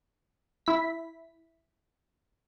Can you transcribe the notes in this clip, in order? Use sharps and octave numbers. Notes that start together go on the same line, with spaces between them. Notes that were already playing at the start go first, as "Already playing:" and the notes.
E4 B6